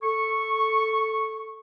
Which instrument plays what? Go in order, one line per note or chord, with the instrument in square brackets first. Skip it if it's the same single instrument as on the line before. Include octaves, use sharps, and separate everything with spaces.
[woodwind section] A4 C#6